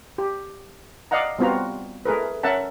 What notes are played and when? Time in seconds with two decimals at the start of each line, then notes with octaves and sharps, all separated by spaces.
0.18 G4
1.11 D5 D#5 F5 F#5 A#5
1.39 G3 B3 C4 F4 F#4 A#5
2.06 A3 G#4 A#4 B4
2.43 C#4 A#4 E5 F#5 A5